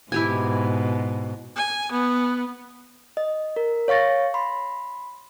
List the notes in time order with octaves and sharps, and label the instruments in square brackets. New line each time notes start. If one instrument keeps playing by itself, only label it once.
[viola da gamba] G#2 B2 [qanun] E4 G4 G#5
[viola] G#5
B3
[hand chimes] D#5
A#4
C#5 F5 C#6 A6 A#6
B5 C6